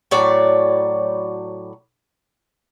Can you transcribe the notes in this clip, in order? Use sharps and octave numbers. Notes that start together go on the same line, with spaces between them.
A2 F#3 C#5 D5